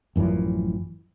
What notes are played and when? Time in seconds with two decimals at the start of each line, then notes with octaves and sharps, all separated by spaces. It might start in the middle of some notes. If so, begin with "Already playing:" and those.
0.16 A1 F#2 E3 F3